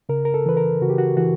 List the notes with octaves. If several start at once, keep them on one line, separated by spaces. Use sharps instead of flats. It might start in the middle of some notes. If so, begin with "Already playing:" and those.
C#3 A#4
A#4
A4
E3 B4
A#4
C#3 F#4
G4
F#4
E3 F#4